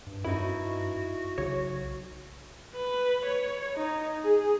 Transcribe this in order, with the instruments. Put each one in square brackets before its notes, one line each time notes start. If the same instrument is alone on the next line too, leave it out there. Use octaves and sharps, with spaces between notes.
[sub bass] G2
[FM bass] F#2 [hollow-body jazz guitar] D#4 E4 [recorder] F#4
[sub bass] B1 [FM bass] C#3 [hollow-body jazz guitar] C#5
[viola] B4
C#5
D#4
G#4